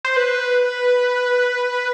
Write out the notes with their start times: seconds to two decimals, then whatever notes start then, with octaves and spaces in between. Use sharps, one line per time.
0.05 C5
0.16 B4